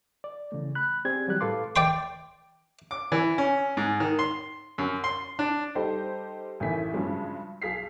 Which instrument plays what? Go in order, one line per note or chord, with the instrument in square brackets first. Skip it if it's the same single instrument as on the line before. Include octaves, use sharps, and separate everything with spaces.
[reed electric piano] D5
C#3 E3 A3
B5 F#6
C4 G4 G#4 D5 G#6
E3 F#3 G3 G4 F#6
A2 A4 B4 F5 C6 D6
[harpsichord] D5 G5 C6
[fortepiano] D6
E3
C#4
G#2
D#3
C6
F#2
C6
D4
[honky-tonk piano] G3 D#4 G4 A4 C5
A1 A2 D#3 E3 G#5 B6
G2 C#3 F3 F#3 G#3
B1 G#4 F5 B6 C7